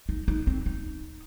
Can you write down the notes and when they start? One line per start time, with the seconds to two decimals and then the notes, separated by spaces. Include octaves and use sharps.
0.09 D#4
0.28 D#4
0.47 C4
0.66 D#4